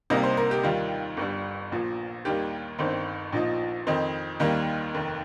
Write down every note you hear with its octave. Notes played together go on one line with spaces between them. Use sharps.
C2 C3 G3 A#3 D#4 D#5
C5
A#4
G4
D#2 D#3 G3 F4
G1 G2 G3
A#1 A#2 F3
D#2 D#3 G3 A#3 G4
G1 G2 D#3 C4 C5
A#1 A#2 F3 D#4
F2 D#3 C4 D#4 C5
D#2 D#3 G3 A#3
F1 D#2 D#3